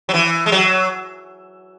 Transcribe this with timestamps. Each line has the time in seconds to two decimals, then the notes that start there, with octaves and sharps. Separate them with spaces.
0.09 F#3
0.14 E3
0.46 G#3
0.52 F#3